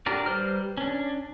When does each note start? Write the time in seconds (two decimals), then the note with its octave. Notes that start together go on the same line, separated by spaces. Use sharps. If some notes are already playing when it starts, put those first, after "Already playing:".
0.06 D4 F#4 G4 A#4 D5
0.26 G3 B4 C5 F6
0.77 C#4 D4